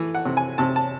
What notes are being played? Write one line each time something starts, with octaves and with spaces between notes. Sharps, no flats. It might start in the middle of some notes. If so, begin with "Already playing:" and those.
Already playing: E3 A3
F#5
C3
G#5
C3 A5
A5